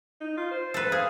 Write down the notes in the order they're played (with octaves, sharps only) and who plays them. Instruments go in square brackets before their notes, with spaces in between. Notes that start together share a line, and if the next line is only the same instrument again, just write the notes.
[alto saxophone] D#4
F4
C5
[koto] A4 B4
[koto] G#4 [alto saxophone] F5